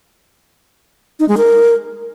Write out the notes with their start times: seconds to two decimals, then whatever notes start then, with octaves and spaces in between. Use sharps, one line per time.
1.20 D#4
1.29 G#3
1.37 A#4